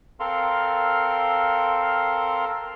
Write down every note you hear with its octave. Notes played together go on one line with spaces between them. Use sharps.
C4 A4 A#4 F5 C6